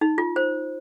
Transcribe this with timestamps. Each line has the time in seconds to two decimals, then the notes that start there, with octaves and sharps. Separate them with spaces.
0.01 D#4
0.18 F4
0.36 C5